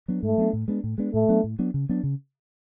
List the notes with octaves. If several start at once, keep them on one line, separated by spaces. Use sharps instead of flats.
F#3 B3 D4
G#2 A3
F#3 B3 D4
A2
G#3 B3 D4
A2
G#3 B3 D4
A2 A3
F#3 B3 D4
A2
F#3 B3 D4
C#3
F#3 B3 D4
C#3